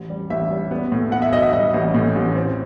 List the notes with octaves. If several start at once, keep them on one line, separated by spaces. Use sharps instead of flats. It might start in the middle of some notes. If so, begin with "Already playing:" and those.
Already playing: A1
G3
A1 E5
G3
B3
A2
B3 F#5
E5
B1 D#5
E5
G3 D#5
A1
A2
A1
C4